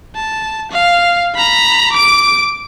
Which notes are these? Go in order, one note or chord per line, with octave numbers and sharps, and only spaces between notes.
A5
F5
A#5 B5
D6 D7